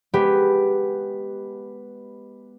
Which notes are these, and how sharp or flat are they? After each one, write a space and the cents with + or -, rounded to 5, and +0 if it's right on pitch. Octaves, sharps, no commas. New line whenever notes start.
G#3 +0 B3 +0 G4 +0